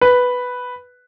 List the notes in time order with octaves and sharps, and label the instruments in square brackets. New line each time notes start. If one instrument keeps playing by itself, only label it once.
[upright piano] B4